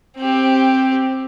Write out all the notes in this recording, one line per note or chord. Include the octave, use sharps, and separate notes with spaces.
C4 G4